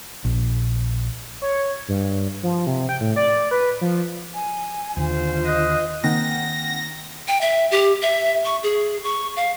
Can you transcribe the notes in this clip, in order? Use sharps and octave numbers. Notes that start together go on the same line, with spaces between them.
A#1
C#5
G2
F3
C3
G5
A2
D5
B4
F3
G#5
D#2 D3 F4 C5
D#5 F#6
D#3 A#3 C4 F#5 G5 A#6
G5
E5
G4
E5
C#6
G#4
C#6
F5